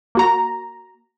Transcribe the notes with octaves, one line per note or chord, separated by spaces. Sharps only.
A#3 F#4 A#5